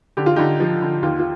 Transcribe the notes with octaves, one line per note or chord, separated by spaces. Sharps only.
D3 G4
F4
D3 D#4 G4
F3
D3
D#2 F4
F4